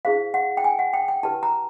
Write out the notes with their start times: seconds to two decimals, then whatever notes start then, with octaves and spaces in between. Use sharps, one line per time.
0.05 E4 G#4 C5 F5
0.34 F#5
0.57 G5
0.64 G#5
0.79 F#5
0.94 G5
1.08 G5
1.23 E4 G4 B4 A5
1.43 A#5